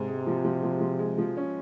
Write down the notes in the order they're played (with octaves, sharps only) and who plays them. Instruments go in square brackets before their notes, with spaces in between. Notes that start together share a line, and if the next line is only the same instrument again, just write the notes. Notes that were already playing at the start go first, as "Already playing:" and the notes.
Already playing: [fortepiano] G#2 [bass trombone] C3
[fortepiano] G#3
F3
F3
F3
F3
G#3
F3
C#4